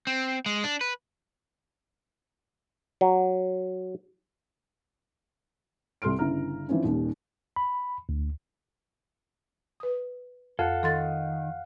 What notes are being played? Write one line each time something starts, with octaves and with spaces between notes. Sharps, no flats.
C4
G#3
D4
B4
F#3
C2 A4 C6 F6 D7
G1 C#3 E4 A#5 F6
E3 F3 C4 C#4 D#4
D#1 D#2 D#3
B5
D2
B4 D#6
F2 A4 F5 F#5
D#3 A4 C6 A6